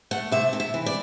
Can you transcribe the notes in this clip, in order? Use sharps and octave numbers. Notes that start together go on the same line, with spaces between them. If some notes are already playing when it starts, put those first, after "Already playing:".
A3 F#5
C3 E5
C3
E5
E3
D5